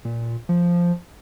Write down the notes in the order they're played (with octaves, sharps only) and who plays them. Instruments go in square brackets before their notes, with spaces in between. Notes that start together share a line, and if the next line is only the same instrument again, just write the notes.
[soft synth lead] A#2
F3